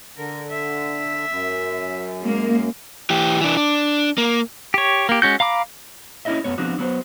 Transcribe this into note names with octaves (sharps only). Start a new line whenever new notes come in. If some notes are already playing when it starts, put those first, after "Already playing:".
D3 A#4
E5
F#2
G#3 A#3
E3 G4
E3 D4
D4
A#3
G4 C#5
A#3 G4
G#3 C#4 F#4 G6
F5 A#5 B5 D6
A#3 C#4 E4 F#4 D#5 E5
F#2 F#3 B3 C#5
F3 B3 C4 D4 D#4 F#4
F#3 B3 A4 C5